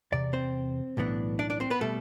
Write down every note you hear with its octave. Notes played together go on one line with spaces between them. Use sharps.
E2 C3 D5
C4 C5
B1 A2 E3 B3 D4
D4 D5
D4 D5
C4 C5
B3 B4
B2 G3 A3 A4